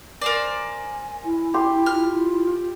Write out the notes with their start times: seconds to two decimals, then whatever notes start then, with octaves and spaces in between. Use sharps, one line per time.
0.21 A#4 C5 D5 G#5
1.25 E4
1.54 G4 C6
1.86 F4 F6